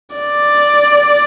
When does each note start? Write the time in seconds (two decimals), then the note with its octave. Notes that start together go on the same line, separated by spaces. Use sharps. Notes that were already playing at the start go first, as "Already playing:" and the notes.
0.16 D5